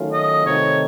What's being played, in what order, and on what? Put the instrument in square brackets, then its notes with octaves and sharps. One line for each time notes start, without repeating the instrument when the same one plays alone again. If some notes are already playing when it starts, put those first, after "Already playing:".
Already playing: [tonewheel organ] D#3 F#3 A3 C#4 F4
[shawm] D#5
[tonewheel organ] C3 D#3 A3 C4 D#4 [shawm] C#5